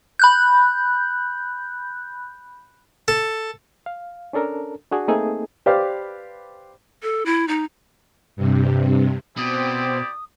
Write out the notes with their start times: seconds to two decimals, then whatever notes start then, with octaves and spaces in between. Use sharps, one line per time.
0.19 B5 F#6 G6
3.08 A4
3.86 F5
4.33 C#4 D4 A4 A#4
4.92 D4 F#4 G#4
5.08 A3 A#3 C4 D#4 G#4 A4
5.66 G4 B4 C5 D5 F5
7.03 A4
7.26 E4
7.48 D#4
8.36 G2 C3
9.37 B2 C4 E4 G4 D5 D#6